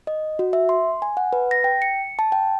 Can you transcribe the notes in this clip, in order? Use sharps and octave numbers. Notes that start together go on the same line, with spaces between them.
D#5
F#4
E5
C6
G#5
F#5
B4
A#6
G5
C#7
A5
G5